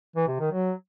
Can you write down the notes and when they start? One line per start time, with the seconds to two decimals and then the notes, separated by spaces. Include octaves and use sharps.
0.16 E3
0.28 C3
0.40 D#3
0.52 F#3